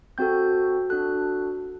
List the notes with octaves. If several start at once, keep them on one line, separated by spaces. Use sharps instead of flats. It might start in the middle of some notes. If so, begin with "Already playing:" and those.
C4 F#4 A4 G6
D4 F#4 A4 F#6